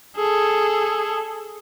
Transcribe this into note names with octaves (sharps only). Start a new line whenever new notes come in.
G#4 A4